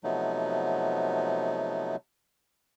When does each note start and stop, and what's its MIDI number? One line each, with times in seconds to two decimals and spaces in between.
0.04 1.96 48
0.04 1.96 53
0.04 1.96 54
0.04 1.96 57
0.04 1.96 59
0.04 1.96 63